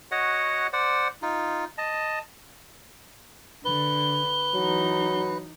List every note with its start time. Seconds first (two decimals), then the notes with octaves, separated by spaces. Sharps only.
0.11 F#4 C#5 D#5 F#5
0.73 C5 D5 F#5
1.22 D#4 F4
1.78 D#5 A5
3.65 D3 B4 G7
4.54 E3 F#3 D#4